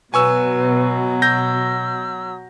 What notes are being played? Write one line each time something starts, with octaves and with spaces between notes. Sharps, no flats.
B2 F#3 B4 G#5 C#6 E6
E6 G6 A#6